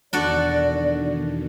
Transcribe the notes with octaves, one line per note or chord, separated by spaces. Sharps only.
E2 B2 D#3 D4 F#4 A4 D5